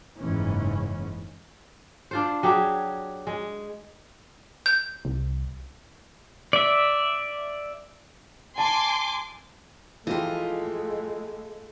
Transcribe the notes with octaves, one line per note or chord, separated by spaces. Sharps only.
F#1 G#2 E3 C#4
D4 F4 C5
F#3 G4 G#4
G#3
G6
C2
D5 E5
G#5 A5 C6 D6
E3 F3 G#3 A3 F4 G4 D#5